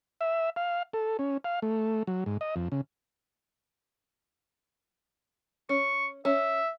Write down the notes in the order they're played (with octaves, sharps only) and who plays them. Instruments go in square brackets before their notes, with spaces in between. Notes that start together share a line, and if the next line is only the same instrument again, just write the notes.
[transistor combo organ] E5
F5
A4
C#4
F5
A3
F#3
G#2
D#5
F2
C#3
[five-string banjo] C#4 [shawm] C#6
[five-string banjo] C#4 [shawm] E5